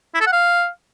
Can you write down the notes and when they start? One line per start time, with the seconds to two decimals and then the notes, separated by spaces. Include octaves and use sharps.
0.15 E4
0.21 A4
0.27 F#5
0.33 F5